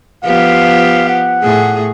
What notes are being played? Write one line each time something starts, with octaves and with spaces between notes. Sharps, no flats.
F3 B3 G4 F5
F#5
A2 G#4